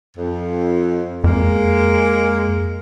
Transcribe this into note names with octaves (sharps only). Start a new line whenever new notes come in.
F2
F2 G#3 A#3